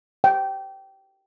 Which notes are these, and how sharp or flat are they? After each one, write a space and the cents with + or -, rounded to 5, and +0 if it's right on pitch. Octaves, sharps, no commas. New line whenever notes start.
G5 -15